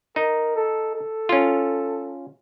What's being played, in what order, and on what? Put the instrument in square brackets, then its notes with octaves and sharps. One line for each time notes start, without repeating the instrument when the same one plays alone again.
[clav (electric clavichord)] D#4 [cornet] A#4
[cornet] A4
A4
[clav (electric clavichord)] C#4 F4